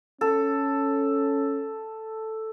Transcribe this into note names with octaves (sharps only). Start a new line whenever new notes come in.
C#4 A4